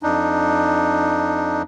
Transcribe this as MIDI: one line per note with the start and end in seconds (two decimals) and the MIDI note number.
0.03 1.62 41
0.03 1.62 62
0.03 1.62 63